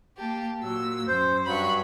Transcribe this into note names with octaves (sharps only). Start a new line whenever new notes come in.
A#3 G4 A5
A#2 F#3 E6
F#2 C5
G2 F#3 B5 C#6